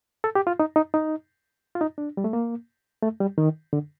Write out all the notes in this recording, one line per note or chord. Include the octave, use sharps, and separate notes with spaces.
A4
G4
F4
D#4
D#4
D#4
F4
D#4
D4
G3
A3
A#3
A3
G3
D#3
D3